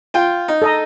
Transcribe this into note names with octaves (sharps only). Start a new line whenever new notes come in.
F4 G5
D#4
A4 D#5 A#5